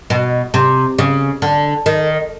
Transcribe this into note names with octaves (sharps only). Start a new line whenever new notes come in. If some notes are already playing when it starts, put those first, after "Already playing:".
B2
C3
C#3
D3
D#3